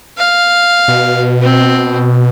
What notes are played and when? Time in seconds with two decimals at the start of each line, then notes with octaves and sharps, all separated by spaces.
0.18 F5
0.88 B2
1.42 C4